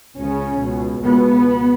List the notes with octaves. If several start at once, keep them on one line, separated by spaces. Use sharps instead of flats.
C#2 C#3 C#4
C#2 B2
C#2 B2 B3